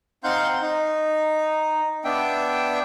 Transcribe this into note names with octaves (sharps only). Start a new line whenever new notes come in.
C4 D#4 F5 F#5 C6 G6
D#4
B3 D4 E5 G5